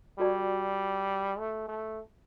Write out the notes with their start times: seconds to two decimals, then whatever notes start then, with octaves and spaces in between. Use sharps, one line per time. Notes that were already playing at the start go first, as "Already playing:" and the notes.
0.19 G3 F#4 A4 D5 A5 C#6
1.38 A3
1.68 A3